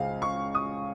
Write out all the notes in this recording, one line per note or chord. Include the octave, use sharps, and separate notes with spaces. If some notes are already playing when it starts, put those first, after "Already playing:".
Already playing: C#2 C#3 C#4 G#4 C5 F5
C#6
D#6